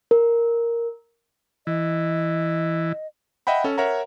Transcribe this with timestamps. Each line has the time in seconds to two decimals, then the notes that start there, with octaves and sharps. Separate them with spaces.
0.11 A#4
1.67 E3 D#5
3.47 D#5 E5 F#5 G5 B5
3.64 C#4 A4
3.78 A#4 C#5 E5 F#5 A#5